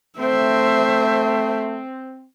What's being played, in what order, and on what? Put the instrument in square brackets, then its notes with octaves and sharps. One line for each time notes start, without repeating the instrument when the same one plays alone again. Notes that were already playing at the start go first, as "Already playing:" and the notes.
[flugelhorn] A3 [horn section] C4 [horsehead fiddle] C5 E5